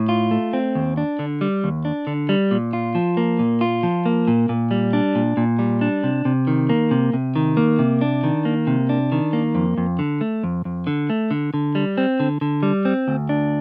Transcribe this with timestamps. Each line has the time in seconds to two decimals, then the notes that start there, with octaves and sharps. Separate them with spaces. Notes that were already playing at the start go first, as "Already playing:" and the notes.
Already playing: A2
0.09 F4
0.31 A3
0.53 C4
0.75 D#2
0.97 D4
1.19 D3
1.41 G3
1.64 D#2
1.85 D4
2.07 D3
2.29 G3
2.51 A#2
2.73 F4
2.95 F3
3.17 A#3
3.39 A#2
3.61 F4
3.83 F3
4.06 A#3
4.28 A#2
4.49 A#2
4.71 G3
4.93 D4
5.15 A#2
5.37 A#2
5.59 G3
5.81 D4
6.04 C3
6.25 C3
6.47 D#3
6.69 A#3
6.91 C3
7.13 C3
7.36 D#3
7.57 A#3
7.79 C3
8.01 D4
8.23 D#3
8.45 A#3
8.67 C3
8.89 D4
9.12 D#3
9.33 A#3
9.55 F2
9.78 F2
9.99 D3
10.21 A3
10.44 F2
10.65 F2
10.87 D3
11.10 A3
11.31 D3
11.54 D3
11.75 G3
11.98 C4
12.20 D3
12.41 D3
12.63 G3
12.85 C4
13.08 D2
13.29 D4